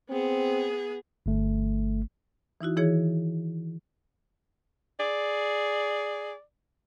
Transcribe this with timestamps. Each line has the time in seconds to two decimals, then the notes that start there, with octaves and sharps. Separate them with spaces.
0.10 B3 C4 G#4
1.26 G1 A3
2.61 E3 D#4 E4 F#4
2.76 D#3 E3 E4 G#4 C#5
5.00 G#4 D5